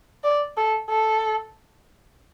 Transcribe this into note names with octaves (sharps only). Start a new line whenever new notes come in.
D5
A4
A4